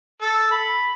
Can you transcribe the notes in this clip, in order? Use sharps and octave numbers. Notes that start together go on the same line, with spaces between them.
A4
B5